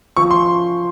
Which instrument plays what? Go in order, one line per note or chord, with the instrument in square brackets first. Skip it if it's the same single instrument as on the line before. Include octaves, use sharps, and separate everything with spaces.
[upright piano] F3 C#6
C6